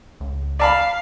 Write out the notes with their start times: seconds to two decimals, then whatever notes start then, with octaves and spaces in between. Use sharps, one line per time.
0.20 C#2
0.60 D5 F5 A5 B5